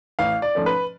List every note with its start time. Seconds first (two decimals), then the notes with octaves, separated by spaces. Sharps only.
0.19 A1 F5
0.42 D5
0.55 G#2 F3 A3 C#4
0.66 B4